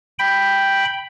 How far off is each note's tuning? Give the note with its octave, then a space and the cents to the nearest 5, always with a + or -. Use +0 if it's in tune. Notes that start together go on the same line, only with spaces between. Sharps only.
G5 +0 B5 +0